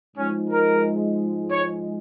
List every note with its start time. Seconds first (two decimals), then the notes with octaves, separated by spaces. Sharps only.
0.17 G#2 F3 G#3 C#4
0.50 A#4
1.51 C#5